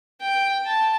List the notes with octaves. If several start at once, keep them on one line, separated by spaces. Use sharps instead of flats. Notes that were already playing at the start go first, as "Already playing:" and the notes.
G5
A5